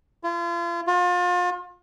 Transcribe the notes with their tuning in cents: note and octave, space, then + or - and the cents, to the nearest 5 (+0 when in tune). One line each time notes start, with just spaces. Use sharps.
F4 -40
F4 +35